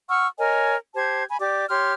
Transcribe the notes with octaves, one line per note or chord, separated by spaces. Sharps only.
F#5 C#6 E6 F6
A#4 C#5 D#5 G#5
G4 C5 A5 G#6
G#5 B5
G4 D5 D6
G4 C#5 C6 F6